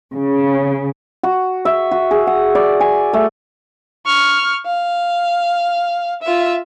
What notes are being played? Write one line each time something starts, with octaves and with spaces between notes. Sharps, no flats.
C#3
F#4
E5
F#4
G#4
F#5
D5
G#5
A3
C#6 F6
F5
F4 E5